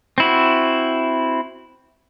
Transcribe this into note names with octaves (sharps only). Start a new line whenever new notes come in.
C4 E4 F#4